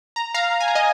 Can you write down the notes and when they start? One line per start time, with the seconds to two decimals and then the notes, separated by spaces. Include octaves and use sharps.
0.16 A#5
0.34 F5 A#5
0.60 G#5
0.68 A#5
0.75 D#5 G#5